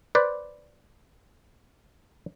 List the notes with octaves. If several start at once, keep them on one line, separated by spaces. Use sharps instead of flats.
B4 C5 D5